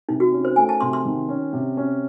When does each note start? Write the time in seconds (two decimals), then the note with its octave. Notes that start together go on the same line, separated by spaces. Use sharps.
0.08 C3 D#4
0.20 F#4
0.32 C#4
0.45 C5
0.56 A3 G#5
0.69 A5
0.81 C3 C6
0.93 C6
1.05 D#3
1.29 C#4
1.53 C3
1.77 C#4